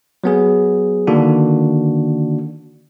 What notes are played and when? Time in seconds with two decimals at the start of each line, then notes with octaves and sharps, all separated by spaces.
0.24 F#3 B3 G#4
1.07 D3 D#3 A#3 D4 F#4